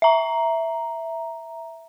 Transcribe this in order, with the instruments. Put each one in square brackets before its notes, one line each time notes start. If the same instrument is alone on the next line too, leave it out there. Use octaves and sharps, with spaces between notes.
[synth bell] E5 A#5